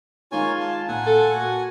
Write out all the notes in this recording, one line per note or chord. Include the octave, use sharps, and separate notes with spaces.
D#3 G#3 A#3 D#4 F4 C#5 G#5
A5
A#2 F#5 G#5
A4
A#3 F#4